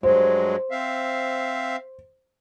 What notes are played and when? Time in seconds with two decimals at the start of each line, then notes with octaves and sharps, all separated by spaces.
0.03 G2 F#3 G#3 C5
0.71 C4 E5 F5